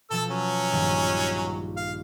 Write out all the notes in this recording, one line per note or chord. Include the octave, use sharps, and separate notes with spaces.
B2 F3 A4 A5 E6
F#3 C#4
A#1 G2 D#3
F5